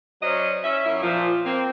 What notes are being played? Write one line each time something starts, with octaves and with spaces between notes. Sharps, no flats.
F#3 C#4 C5 D5 D#5
C#4 E5
F#2 E4
A#2 F3
A#3 C4